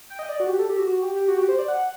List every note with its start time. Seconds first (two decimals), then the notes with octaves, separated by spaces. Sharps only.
0.10 G5
0.19 D#5
0.29 D5
0.40 F#4
0.49 G4
0.59 A4
0.69 G4
0.79 F#4
0.89 F#4
1.02 G4
1.16 G4
1.28 F#4
1.38 G4
1.49 C5
1.59 D5
1.68 F#5